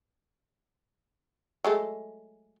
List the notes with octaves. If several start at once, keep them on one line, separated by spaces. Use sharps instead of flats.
F#3 G#3 A3